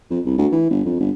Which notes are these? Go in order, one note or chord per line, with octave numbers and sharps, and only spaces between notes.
F2
C2
D2
E3
G1
F2
G1